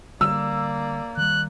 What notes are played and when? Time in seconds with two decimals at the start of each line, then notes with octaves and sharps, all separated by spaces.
0.21 D3 G3 A#3 D5 E6
1.17 D#3 G3 F#6